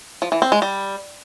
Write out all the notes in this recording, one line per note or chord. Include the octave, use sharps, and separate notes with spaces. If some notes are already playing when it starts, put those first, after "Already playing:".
F3
E3
C4
G#3
G3